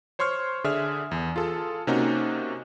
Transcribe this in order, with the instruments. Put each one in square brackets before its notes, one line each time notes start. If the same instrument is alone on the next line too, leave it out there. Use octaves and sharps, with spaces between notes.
[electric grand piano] C5 C#5 C6 C#6 F6 G#6
D3 G#4 D5 E5 F6
E2
F4 G#4 A4
C3 A#3 C#4 D#4 F#4